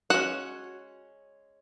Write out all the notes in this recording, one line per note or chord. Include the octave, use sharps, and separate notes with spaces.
G#3 C#4 F#4 F#5